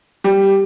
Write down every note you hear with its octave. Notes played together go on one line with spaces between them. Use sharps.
G3